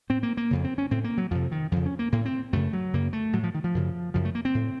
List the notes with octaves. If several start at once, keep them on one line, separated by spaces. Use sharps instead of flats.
A2 C4
A#3
A#3
F2 C#3
C4
C#4
A2 C4
A#3
F#3
F2 C3 F3
D#3
F2 C#3 F3
C#4
A#3
A2 A#3
C4
F#2 C#3 A3
F#3
F#2 C#3 A#3
A3
A2 F#3
F3
D#3
F3
F#2 C#3
F#2 C#3 F3
A3
A#3
C4
A2